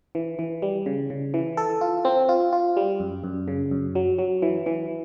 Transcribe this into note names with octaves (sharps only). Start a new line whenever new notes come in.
E3
E3
G3
C#3
C#3
E3
A4
F4
C4
F4
F4
G3
F#2
F#2
C#3
F#2
F#3
F#3
E3
E3